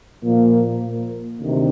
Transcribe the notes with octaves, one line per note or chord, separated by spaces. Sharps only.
A#2 F3 A#3
D2 C3 D#3